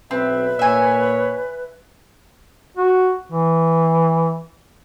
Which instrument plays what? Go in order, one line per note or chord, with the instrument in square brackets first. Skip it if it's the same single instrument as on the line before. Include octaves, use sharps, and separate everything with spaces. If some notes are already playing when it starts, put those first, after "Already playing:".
[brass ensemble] B1 E5 [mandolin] C4 [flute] B4
[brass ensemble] A#2 C#5 [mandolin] E5 G#5
[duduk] F#4
E3